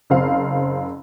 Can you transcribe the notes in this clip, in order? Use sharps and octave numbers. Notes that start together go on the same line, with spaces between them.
F#1 C4 F5